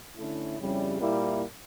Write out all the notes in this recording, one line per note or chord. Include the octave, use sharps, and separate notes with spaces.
D3 A3 C#4 E4
F2 C#3 G3 C#4 E4
A#2 G3 A#3 E4